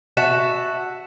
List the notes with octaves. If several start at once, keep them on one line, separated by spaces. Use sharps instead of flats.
F#4 E5 A5